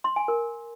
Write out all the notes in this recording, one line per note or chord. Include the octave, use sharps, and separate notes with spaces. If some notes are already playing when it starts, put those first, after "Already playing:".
C6
G#5
A#4